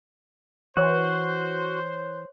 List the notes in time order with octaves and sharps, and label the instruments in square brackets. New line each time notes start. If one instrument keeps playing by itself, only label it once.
[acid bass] E3 [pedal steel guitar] F#4 [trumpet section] C5 [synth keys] C#5 F#6